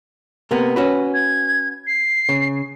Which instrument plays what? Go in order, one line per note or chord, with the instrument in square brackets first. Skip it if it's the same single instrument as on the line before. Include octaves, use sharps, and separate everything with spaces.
[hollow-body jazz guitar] C3 A#3 B3
C#4 F#4 B4
[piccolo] G#6
C7
[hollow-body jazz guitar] C#3